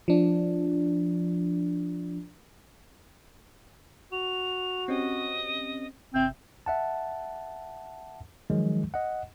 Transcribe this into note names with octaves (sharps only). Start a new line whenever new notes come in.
F3 D4
F#4 F7
C4 C#4 G4 D#5
G1 C3 C4 E5 G6
E5 F#5 A5
D#3 F3 F#3 G#3
D#5 F#5